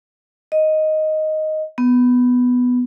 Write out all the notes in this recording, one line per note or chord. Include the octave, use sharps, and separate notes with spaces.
D#5
B3